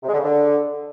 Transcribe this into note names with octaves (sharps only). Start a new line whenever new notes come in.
C3
G#3
D3
C#3
D3